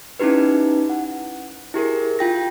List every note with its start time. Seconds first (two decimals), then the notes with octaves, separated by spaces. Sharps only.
0.19 C#4 D#4 E4 G4 B4
0.90 F#5
1.74 E4 G4 G#4 A#4
2.19 F4 G5 A#6